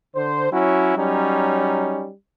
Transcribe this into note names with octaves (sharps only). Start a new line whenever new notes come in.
D3 C5
F#3 C#4 E4 F#4
F#3 G3 C#4 D#4